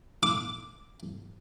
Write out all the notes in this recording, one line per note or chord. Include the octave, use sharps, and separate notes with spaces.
D6